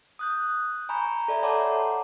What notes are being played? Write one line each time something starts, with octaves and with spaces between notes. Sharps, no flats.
D#6 F#6 G6
G#5 A#5 B5 C#6 G6
A4 D5 E5
C#5 F#5 A5 A#5 C6 D6